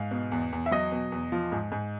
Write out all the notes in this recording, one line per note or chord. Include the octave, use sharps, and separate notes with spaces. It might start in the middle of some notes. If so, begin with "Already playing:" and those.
Already playing: G#2 F5
B2
E2
E2
E5
F#3 D#5
B2
E2
F3
G#2
G#2